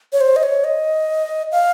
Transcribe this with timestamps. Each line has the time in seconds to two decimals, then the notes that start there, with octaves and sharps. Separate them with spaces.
0.13 C#5
0.21 C5
0.36 D#5
0.43 C#5
0.64 D#5
1.52 F5